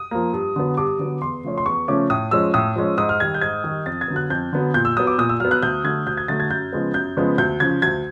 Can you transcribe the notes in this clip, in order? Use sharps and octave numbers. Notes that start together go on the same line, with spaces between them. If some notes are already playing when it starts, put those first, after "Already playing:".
Already playing: D#6
F3 A#3
G2
D3 F#3 B3
G2 D6
D3 F#3 B3
E2 C6
C#3 F3 A3 C#4
C6
E2 C#6
C#3 F3 A3 C#4 D6
A2 D#6
F3 G#3 C#4 E6
A2 D#6
F3 G#3 C#4
G#2 D#6
F6
D#3 G3 G#6
G6
G#2 G#6
D#3 G3
F2 A6
G#6
D3 F#3 B3
F#6
F2 G6
D3 F#3 B3
A#2 G6
E6
F#3 B3 D#6
D6
A#2 D#6
E6
F#3 B3 F6
F#6
D2 G6
D3 F#3 A3 G#6
D2 G6
G#6
D3 F#3 A3 A6
G#6
F#2 G6
C#3 F3 G#3 B3
F#2 G6
C#3 F3 G#3 B3
D2 G6
C#3 F3 G#6
D2 G#6